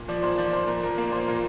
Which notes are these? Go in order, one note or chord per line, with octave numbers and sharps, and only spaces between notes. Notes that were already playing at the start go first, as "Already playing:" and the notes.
Already playing: A#2
F3 D5
A#2 C5
F3 D5
A#2 C5
A#2 A#4
F3 A#4
A#3 D5
A#2 C5
A#2